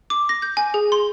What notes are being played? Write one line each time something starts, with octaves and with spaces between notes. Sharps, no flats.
D6
A#6
G6
G#5
G#4
C6